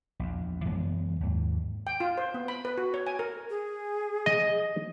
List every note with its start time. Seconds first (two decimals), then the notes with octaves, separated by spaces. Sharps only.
0.20 A#1 E2
0.65 F#2 E3 G#3 B3
1.20 D#2 G#2
1.87 G5
2.00 F4
2.18 C5
2.34 B3
2.48 B5
2.65 B4
2.78 F#4
2.94 C#5
3.07 G#5
3.19 A#4
3.50 G#4
4.26 D#5